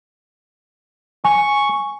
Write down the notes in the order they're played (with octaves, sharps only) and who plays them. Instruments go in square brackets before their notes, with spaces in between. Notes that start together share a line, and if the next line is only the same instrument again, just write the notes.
[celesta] G#5 [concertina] C#6